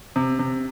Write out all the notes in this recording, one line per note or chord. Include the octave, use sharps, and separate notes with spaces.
C3
C3